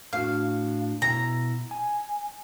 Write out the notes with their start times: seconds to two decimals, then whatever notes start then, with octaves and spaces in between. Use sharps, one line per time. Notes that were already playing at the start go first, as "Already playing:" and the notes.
0.13 A2 D4 F#4 F5
1.02 B2 E4 A#5
1.71 G#5